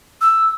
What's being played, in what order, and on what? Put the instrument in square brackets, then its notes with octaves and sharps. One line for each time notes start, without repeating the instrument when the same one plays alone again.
[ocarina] E6